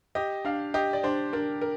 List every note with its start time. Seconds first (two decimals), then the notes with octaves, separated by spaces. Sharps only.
0.15 G4 D#5
0.45 D4 F5
0.74 G4 D#5
0.93 D5
1.03 D4 C5
1.33 D4 A#4
1.61 A#4